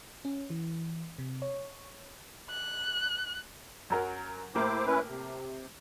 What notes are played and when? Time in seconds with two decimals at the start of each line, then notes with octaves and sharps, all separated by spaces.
0.25 C#4
0.50 E3
1.19 C3
1.42 C#5
2.50 F#6
3.90 F#2 F#3 A#4
4.55 A2 A#3 E4 G4 C5 D6
4.86 C#4 E4 B4
5.08 C3